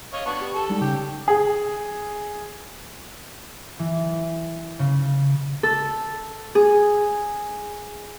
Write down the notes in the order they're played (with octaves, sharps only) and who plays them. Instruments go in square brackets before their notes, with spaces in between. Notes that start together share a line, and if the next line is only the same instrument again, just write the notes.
[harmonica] C#5 D#5 F5
B3 D4 C#6
[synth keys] G4
[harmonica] A4
[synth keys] G3 G#3 D#4
[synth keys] C#3 [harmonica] G4
[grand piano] G#4
[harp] E3
C#3
A4
G#4